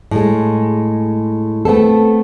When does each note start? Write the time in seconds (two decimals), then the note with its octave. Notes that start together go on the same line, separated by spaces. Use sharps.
0.11 A2 G#3
1.65 A3 B3 C4 A4